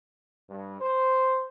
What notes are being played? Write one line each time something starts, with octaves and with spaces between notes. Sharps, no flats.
G2
C5